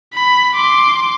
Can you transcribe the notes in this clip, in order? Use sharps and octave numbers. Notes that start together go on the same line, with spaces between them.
B5
C6 D6